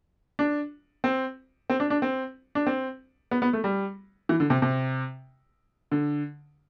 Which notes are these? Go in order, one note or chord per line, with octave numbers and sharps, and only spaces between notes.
D4
C4
C4
D4
D4
C4
D4
C4
B3
B3
A3
G3
E3
D3
C3
C3
D3